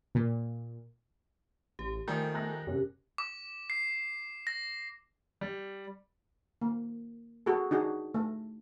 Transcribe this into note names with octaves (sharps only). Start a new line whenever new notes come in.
A#2
A1 G4
D#3 F3 G3 A3 A#4 G#5
A#5 F#6 A#6
F#2 C3 C#4 G4
D6
C7
A#6
G3
A#3
F#4 G#4 A4
D4 D#4 F#4 G#4
A3